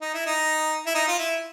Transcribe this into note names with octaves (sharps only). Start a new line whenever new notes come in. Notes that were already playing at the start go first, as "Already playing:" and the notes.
D#4
E4
D#4
E4
D#4
F4
E4